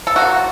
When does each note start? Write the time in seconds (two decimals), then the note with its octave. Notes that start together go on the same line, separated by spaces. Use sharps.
0.07 A4
0.16 C3 D#3 A#3 F#4